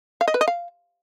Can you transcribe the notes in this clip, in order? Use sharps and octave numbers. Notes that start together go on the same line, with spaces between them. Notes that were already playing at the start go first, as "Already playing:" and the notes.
F5
D#5
B4
D#5
F5